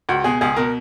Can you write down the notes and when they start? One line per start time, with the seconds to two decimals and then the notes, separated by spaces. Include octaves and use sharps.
0.09 C#2 F#4
0.24 B2 G#4
0.41 C#2 G#4
0.56 B2 A#4